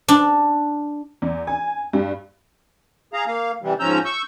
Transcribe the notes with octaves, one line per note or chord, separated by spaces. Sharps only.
D4
E2
G#5
G2
G#4 F5 A#5
A#3 F5
C3 E3 G3
G#2 F3 C#4 A#5 E6 G6
C#6 E6 G6